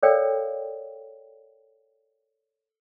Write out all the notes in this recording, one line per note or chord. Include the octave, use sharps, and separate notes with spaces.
A4 A#4 C#5 D5 F5 G5